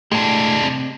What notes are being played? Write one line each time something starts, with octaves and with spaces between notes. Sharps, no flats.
A2 G#3 A3 D4 G4
C3